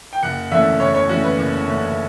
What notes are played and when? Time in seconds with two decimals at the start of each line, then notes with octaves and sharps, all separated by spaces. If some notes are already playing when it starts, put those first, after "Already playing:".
0.13 G5
0.23 F#1 F#5
0.51 E2 D3 A3 C#4 E5
0.80 F#1 C#5
0.95 C#5
1.09 E2 D3 A3 C#4 F#4
1.24 B4
1.38 F#1
1.67 E2 D3 A3 C#4